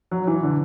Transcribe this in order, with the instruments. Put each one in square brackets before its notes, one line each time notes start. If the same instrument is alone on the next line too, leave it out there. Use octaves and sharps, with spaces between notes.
[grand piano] F#3
E3
D3